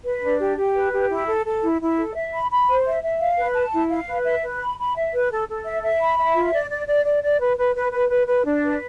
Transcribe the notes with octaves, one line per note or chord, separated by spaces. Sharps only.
B4
D4
G4
G4
B4
G4
E4
A4
A4
E4
E4
A4
E5
B5
B5
C5
E5
E5
F5
B4
A5
E4
F5
B4
E5
B4
B5
B5
E5
B4
A4
A4
E5
E5
B5
E5
F4
D5
D5
D5
D5
D5
B4
B4
B4
B4
B4
B4
D4
B4